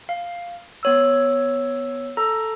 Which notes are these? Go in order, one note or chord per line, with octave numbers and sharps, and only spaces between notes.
F5
B3 C#5 E6
A4 A#5